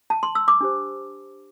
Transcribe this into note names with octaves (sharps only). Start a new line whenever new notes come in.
A5
C6
E6
D6
D4 G4 C5